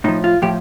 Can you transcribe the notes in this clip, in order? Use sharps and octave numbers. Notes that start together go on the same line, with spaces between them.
A2 F3 D#4
F4
A2 F3 G4